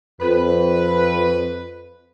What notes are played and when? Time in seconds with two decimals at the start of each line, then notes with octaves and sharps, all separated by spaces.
0.20 F2 B4